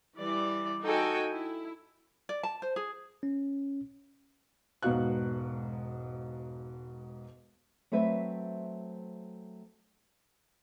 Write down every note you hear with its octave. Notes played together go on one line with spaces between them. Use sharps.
E3 G3 D5
D#4 F#4 A4 G5 G#5
E4
D5
A5
C5
G#4
C#4
E1 G#2 B3 F#4 F5 F#6
F#3 A3 C4 B4 C5 E5